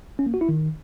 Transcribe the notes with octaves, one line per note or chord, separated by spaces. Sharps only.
C#4
A#3
F#4
E4
D#3